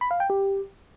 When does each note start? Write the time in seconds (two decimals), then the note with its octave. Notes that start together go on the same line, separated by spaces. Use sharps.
0.01 B5
0.11 F5
0.20 G5
0.30 G4